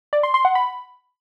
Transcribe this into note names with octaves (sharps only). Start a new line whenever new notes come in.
D5
C6
C6
F#5
B5